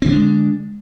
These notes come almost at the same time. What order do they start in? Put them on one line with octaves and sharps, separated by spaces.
C4 D3 D4 G#3